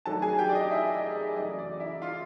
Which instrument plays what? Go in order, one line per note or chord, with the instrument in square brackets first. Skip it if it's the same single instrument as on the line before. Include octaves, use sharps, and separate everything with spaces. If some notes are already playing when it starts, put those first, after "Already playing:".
[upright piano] G#2 D#3 F#3 A3 D4 A4 A5
G#4 G#5
G4 G5
D5
D#5
E4 E5
D#5
D5
D5
F#2 C#3 E3 A3 D#5
D5
E4 E5
F4 F5